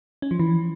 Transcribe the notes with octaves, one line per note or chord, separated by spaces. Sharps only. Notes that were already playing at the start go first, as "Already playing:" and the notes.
C#4
F3
E3